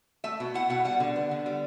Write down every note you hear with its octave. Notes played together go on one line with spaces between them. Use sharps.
A3 E5
B2
E4 F#5
B2 F#5
G3 F#5
D3
B3
D3
G3